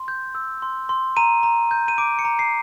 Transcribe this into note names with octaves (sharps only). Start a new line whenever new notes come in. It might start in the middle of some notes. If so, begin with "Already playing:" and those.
Already playing: C6
G6
E6
C6
C6
A#5 D#7
A#5
G6
D#7
D6 D7
C#7
A#5
C7